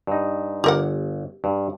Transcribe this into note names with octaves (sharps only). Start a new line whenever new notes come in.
G2 D#4
G1 G4 A#4 F#5
G2